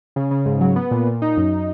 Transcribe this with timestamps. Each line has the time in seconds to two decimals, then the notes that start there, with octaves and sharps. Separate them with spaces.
0.16 C#3
0.31 C#3
0.46 G#2
0.61 F#3
0.76 B3
0.91 A#2
1.07 A#2
1.22 D#4
1.37 F#2